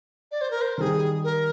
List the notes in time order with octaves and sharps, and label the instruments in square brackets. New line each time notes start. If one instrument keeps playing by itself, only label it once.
[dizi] D5
C5
A#4
C5
[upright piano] D#3 G3 [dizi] G#4 A#4
[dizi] A#4